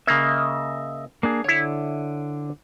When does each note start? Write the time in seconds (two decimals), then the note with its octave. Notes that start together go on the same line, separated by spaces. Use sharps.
0.07 C#3 A#3 D#5 E5
1.23 A#3 D4 G#4
1.44 D3 E4 C#5